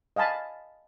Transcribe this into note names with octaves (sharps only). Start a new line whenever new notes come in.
D#5 F5 G#5 A5 B5